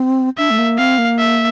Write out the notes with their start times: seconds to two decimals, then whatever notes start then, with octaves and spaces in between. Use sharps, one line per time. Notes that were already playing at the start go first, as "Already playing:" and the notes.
Already playing: C4
0.38 D4 E5
0.51 A3
0.58 A#3
0.78 C4 F5
0.98 A#3
1.18 E5